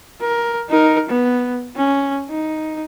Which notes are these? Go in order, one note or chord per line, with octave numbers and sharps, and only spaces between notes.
A#4
D#4 A#4
B3
C#4
D#4